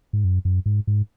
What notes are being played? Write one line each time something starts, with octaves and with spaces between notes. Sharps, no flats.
G#2
F#2
F#2
G#2
G#2